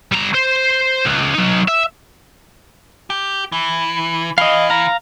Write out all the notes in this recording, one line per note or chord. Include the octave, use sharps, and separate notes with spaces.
G3 A#5
C5
C#2
F#3 D#4
E5
G4
E3
E3 D#5 F5
F5 A#5